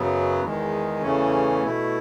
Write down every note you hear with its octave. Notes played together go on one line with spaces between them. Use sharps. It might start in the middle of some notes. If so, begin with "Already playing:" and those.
Already playing: F#2 C#3 F#3 B3
E2 D#3 G#3
E2 C#3 E3 A3 C#4
B2 A3 E4